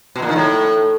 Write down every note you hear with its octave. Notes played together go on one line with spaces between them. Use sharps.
B2
A#2
D#3
A2